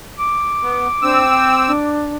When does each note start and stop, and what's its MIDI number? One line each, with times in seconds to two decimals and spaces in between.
0.19 2.00 86
0.62 0.88 59
1.03 1.72 60
1.03 1.27 62
1.03 1.72 88
1.28 1.61 79
1.67 2.17 62